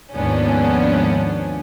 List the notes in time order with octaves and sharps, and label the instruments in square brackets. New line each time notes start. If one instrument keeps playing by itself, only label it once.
[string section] D#2 G#2 F3 B3 C#4 D4